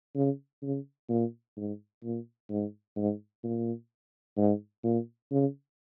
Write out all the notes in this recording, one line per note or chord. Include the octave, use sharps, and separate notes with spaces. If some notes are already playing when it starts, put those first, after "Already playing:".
C#3
C#3
A#2
G#2
A#2
G#2
G#2
A#2
G#2
A#2
C#3